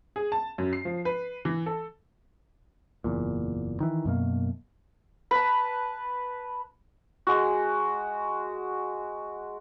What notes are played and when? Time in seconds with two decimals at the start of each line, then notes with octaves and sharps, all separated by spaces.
0.16 G#4
0.32 A5
0.58 F#2
0.73 C7
0.85 F3
1.05 B4
1.45 E3
1.66 A4
3.04 F#1 E2 A#2
3.80 D#3 E3
4.05 F#2 B2 A#3
5.31 B4 A5
7.27 G#3 F#4